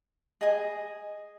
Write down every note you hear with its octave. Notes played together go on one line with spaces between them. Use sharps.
G#4 D#5 G#5 D#6